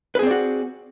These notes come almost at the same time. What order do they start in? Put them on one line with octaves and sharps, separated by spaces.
B4 G#4 C4 D5 F#4